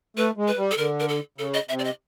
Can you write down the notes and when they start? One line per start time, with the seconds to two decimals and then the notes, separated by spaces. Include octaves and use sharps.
0.17 A3 B4
0.37 G#3
0.48 B4
0.57 G3
0.71 A4
0.77 D3 A#4
1.00 A#4
1.08 A4
1.38 C#3 A4
1.54 D#5
1.69 C3 E5
1.79 D5
1.84 D#5